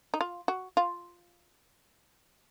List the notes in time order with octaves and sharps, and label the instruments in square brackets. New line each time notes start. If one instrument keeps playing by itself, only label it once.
[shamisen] D#4
F4
F#4
F4